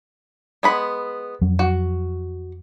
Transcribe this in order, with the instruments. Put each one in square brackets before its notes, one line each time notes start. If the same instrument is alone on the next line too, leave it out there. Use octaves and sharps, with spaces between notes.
[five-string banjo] G#3 B3 B5
[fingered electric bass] F2 F#3
[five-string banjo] F#4